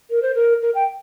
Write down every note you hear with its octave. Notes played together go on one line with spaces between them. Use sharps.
A#4
C5
A#4
A#4
G5